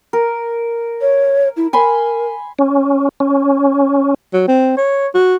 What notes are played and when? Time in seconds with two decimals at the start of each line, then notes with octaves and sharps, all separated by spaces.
0.13 A#4
1.01 C#5
1.56 E4
1.73 A#4 G#5 B5 C6
2.59 C#4
3.20 C#4
4.33 F#3
4.48 C4
4.77 C#5
5.14 F#4